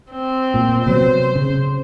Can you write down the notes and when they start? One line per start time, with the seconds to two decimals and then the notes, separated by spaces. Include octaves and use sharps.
0.11 C4
0.54 A#2
0.86 C3 F#3 B3 C5
1.35 C#3